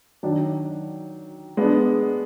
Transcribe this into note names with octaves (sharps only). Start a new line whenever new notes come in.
D#3 F#3 D4
G#3 B3 D4